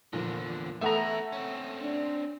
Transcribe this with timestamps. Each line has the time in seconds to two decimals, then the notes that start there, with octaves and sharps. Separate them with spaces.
0.13 E2 A#2 D3 F3
0.81 A3 B3 E4 A4 E5 F#5 A#5
1.32 C4 C#4
1.83 D4